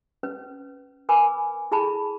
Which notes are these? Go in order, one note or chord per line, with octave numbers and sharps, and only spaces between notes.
C#4 B4
A#4 B4 G#5 B5 D6
E4 G#4 A4 A5 B5